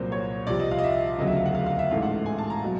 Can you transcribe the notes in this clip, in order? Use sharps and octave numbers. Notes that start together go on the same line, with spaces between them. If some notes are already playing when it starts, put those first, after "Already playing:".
Already playing: C2 A#2 F#3 C5
C#5
C2 C3 F3 D5
D#5
F5
D#5
E5
E1 D2 C#3 F#3 D#5
E5
F5
F#5
F5
F5
E5
A1 G#2 E3 A3 F5
F#5
G#5
A5
A#5
B2 F#3